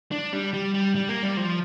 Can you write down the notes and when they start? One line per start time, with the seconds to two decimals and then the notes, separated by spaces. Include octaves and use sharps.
0.12 D4
0.33 G3
0.54 G3
0.74 G3
0.95 G3
1.09 A#3
1.23 G3
1.37 F3